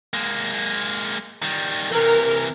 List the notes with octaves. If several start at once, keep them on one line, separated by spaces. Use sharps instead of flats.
G#3 A#3
D#3 G3
C3 E3 A#4